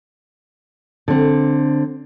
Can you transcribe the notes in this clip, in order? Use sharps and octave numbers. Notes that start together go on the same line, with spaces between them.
D3 C4